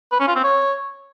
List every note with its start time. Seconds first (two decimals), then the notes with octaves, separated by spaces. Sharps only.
0.12 B4
0.20 C#4
0.28 F4
0.36 C4
0.44 C#5